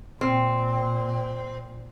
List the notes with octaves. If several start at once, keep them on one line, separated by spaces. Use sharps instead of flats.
A#2 C4